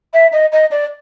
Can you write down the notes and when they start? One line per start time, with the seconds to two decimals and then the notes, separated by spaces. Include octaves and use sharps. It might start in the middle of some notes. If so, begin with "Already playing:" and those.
0.13 E5
0.32 D#5
0.52 D#5
0.71 D5